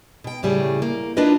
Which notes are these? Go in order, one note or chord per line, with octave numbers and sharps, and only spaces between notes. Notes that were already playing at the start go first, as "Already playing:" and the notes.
B2 G5
A2 C#3 G3 A3 G#4
A#3
D4 E4 F4 A#4 B4 D#5